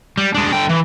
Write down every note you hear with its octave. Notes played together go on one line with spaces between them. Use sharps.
G3
G#3 D4
D3 G5
E3